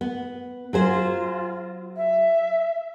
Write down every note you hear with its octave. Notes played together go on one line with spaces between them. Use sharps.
B3
F#3 F4 G#4 C5
E5